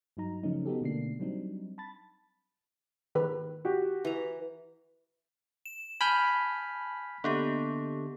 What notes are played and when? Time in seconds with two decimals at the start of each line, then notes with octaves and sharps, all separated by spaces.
0.17 G2 F#3 D#4 A#5
0.43 C#3 F3 F#3 A3 C#4 D#4
0.66 B3 D#4 F#4 G4 A4
0.81 B2 D3 A3 A#3 D4 C7
1.20 F#3 G3 C4 D4 D#4
1.78 A5 B5 A6
3.15 D#3 B4
3.65 F#4 G4
4.05 E3 A#5
5.66 E7
6.01 G#5 A5 B5 F6 G6
7.24 D3 A#3 B3 G4